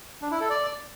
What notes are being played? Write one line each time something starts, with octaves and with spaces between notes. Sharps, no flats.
D4
E4
A4
D5